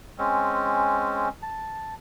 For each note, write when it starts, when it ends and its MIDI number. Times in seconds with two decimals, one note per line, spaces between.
0.18 1.29 56
0.18 1.29 60
0.18 1.29 61
1.43 1.94 81